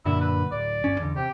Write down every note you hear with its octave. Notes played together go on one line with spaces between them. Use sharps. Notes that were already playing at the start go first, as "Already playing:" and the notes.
F#2 A#2 D3 E4
B4
D1 D5
G1 C#4
E2 D3
C3 G4